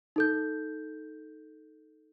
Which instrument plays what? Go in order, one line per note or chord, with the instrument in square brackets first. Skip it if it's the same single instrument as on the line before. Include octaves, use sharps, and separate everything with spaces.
[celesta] D#4 A4 G6